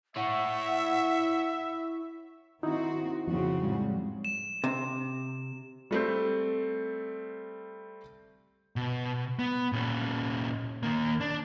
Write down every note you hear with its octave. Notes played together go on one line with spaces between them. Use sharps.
E4 C#5 E5 F#5
D#3 C4 D#4 E4 F#4
F2 C#3 C4 F#4
A2 G3 G#3
E7
C3
G3 A3 C4
B2
B3
A#2 C#4
D#2 A#3
D4